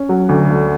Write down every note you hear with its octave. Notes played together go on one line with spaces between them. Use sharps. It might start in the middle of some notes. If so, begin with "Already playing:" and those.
Already playing: C#4
F#3
D2
D3